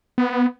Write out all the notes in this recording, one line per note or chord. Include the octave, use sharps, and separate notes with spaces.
B3